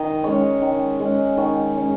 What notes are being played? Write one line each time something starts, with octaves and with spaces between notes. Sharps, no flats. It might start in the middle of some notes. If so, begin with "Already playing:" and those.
Already playing: D#3 D#5
G#3 C#4 C#5
D#3
G#3 C#4
D#3 C#5
G#3 C#4